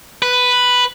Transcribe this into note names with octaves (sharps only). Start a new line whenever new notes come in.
B4